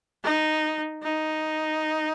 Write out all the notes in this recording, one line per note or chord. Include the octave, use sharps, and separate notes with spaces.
D#4
D#4